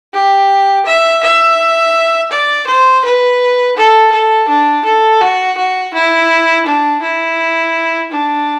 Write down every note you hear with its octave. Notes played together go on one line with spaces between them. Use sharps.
G4
E5
E5
D5
C5
B4
A4
A4
D4
A4
F#4
F#4
E4
D4
E4
D4